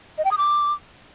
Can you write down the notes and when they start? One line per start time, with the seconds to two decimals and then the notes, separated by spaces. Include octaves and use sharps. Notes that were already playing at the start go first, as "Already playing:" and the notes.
0.18 D#5
0.25 G5
0.31 D#6
0.38 D6